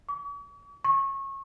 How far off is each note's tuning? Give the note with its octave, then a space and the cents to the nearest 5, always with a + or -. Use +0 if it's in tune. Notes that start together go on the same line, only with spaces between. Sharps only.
C#6 +45
C#6 -25